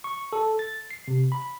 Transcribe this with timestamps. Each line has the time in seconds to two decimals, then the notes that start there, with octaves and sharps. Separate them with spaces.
0.04 C#6
0.33 A4
0.59 A6
0.91 C7
1.08 C3
1.32 B5